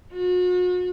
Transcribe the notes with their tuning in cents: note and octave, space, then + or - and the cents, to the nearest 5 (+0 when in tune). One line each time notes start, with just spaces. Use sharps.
F#4 -40